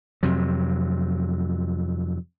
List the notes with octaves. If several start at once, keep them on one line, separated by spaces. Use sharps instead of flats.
F2 C3 F#3